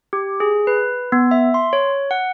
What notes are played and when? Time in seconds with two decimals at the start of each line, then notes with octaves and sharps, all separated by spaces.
0.13 G4
0.40 G#4
0.67 B4
1.12 B3
1.31 E5
1.54 C6
1.73 C#5
2.11 F#5